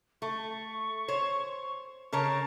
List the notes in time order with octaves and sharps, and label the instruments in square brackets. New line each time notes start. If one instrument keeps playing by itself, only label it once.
[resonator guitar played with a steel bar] A3 [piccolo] C#6
[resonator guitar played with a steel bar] C5 C#5
[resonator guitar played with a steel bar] C#3 A#4 C#5 [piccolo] A5